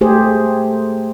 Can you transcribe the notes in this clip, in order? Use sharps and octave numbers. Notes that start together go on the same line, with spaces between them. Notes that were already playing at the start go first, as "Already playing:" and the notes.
A3 G4 G#4 C5